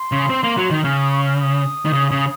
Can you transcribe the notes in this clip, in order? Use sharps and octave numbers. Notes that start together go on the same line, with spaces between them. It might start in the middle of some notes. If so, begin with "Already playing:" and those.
Already playing: C6
C#3
C4
A#3
F#3
D#3
C#3 F6
D#6
C#6
F6
D#6
D#3
C#3
C#3